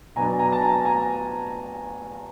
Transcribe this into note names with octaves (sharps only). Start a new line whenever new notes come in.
B2 F#3 B3 D4 G#5 A#5
G#5 A#5
A5
G#5 A#5
G#5 A#5